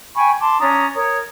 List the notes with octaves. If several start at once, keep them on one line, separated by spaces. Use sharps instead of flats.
G5 G#5 B5 C#6
A5 C6 D6
C#4 D4 A#5 D#6
A#4 C#5 D#6